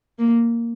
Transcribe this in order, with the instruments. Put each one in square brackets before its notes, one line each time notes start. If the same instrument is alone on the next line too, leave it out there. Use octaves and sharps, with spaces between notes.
[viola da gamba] A#3